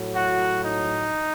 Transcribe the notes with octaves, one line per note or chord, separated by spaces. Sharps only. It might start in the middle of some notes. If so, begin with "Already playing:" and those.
Already playing: A2 F#3
F#4
D#4